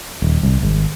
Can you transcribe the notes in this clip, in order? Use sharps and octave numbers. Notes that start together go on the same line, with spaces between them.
D#1
C2
G#1